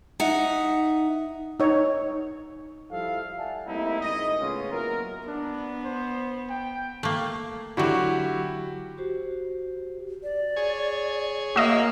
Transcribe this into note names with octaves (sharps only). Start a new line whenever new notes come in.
D#4 E5 F#5
D#4 C#5
F3 G3 E4 A4 F5
D5 E5 F#5 G#5 A5
G3 A3 A#3 C4 D#4 E4
G#1 C#2 G#2 D#3 D#5
A2 C#3 G#3 B3 C#4 F4
F#3 A#3 B3 E4 A#4
B3 D4
C5
G5
A3 A#3
D3 F#3 E4 F#4 G4
F#4 G4 C5
D5
G#4 C#5
A#3 F#4 D#5 E5